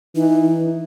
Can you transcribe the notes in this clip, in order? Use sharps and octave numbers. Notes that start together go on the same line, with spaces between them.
E3 D#4